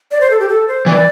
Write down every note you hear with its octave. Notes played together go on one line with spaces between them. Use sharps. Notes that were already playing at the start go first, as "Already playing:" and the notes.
D5
C5
A4
G4
A4
C5
E3 D5